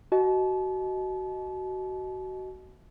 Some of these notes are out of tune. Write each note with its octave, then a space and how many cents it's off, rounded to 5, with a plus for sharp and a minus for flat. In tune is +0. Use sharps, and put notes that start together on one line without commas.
F#4 +20 D#5 +5 A5 -35